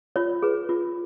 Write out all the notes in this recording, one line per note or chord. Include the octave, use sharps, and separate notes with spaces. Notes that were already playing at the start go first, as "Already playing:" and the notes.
F4 C#5
G#4 B4
F4